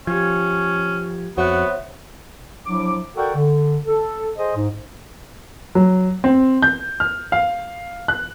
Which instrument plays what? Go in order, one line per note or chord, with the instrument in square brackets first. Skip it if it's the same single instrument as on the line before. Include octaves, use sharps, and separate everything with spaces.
[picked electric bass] F3 [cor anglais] C#4 [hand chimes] G4 G#6
[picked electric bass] F2 [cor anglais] B3 [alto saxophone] F#4 [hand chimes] C5 C#5 E5
[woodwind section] F3 F#3 D4 E4 D6
F#4 A4 A#4 D5 F#5 G5
D3
A4
G#4 C5 D#5
G#2
[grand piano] F#3
C4
G6
F6
F5
F#6